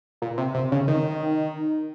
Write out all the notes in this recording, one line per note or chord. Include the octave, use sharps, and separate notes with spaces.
A#2
C3
C3
C#3
D#3